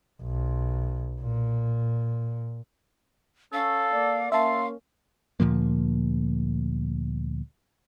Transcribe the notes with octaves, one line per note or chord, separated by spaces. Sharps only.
B1
A#2
C#4 A4 F5
A#3 D5
A#3 C#4 E5 F5 A5 C6
D2 A#2 F3 A#3